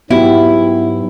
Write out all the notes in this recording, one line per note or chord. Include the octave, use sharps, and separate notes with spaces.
G#2 F#3 B3 E4 F#4 G4